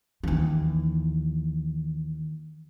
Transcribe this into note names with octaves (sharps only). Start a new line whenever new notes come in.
D#2 E3